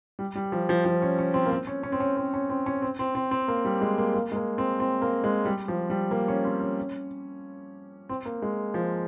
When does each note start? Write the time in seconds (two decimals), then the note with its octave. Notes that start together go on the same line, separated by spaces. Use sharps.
0.19 G3
0.35 G3
0.52 F3
0.69 F3
0.85 F3
1.02 C#4
1.18 C#4
1.34 C4
1.46 A#3
1.51 C4
1.67 C#4
1.83 C#4
1.92 C4
2.00 C#4
2.17 C4
2.34 C#4
2.50 C4
2.66 C#4
2.82 C4
2.99 C4
3.15 C4
3.31 C4
3.48 A#3
3.65 G3
3.81 G#3
3.98 A#3
4.14 A#3
4.32 G#3
4.36 A#3
4.58 C4
4.80 C4
5.02 A#3
5.24 G#3
5.45 G3
5.68 F3
5.90 G3
6.11 A#3
6.28 C#4
6.45 C4
6.61 C#4
8.09 C4
8.25 A#3
8.42 G#3
8.74 F3